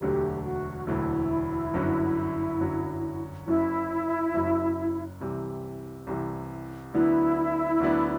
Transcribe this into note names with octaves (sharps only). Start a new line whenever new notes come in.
E1 D2 D3 F#3 A3 G4
F#4
E1 D2 D3 F#3 A3 E4
G1 F#2 D3 F#3
G1 F#2 D3 F#3
F#1 F#2 F#3 E4
F#1 F#2 F#3
C2 C3 E3 G3
C2 C3 E3 G3
D2 D3 F#3 B3 D4 E4
D2 D3 F#3 B3 D4